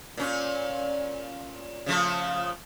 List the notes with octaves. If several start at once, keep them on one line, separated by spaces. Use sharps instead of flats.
A#2 C#4
C#3 F3 A3